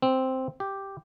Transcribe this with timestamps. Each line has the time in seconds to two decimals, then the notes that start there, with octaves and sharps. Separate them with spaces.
0.02 C4
0.60 G4